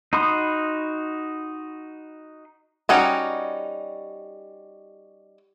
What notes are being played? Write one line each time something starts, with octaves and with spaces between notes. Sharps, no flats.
D#4 F#4 B5 C6 D#6
G3 C#4 D#4 F#4